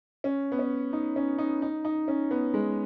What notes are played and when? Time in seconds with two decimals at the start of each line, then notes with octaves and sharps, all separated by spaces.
0.24 C#4
0.52 B3
0.59 C#4
0.93 D#4
1.16 C#4
1.38 D#4
1.62 D#4
1.85 D#4
2.08 C#4
2.31 B3
2.54 G#3